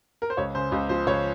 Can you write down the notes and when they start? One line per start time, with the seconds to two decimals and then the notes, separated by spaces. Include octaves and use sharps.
0.22 A#4
0.30 C5
0.37 C#2 C#5
0.55 C#3 C5
0.72 C#2 C5
0.89 F3 C5
1.07 C#2 C#5